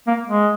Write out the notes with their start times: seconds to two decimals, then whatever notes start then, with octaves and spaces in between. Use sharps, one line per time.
0.07 A#3
0.29 G#3